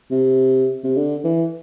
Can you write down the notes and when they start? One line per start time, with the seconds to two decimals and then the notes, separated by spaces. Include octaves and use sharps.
0.11 C3
0.84 C3
0.96 D3
1.24 E3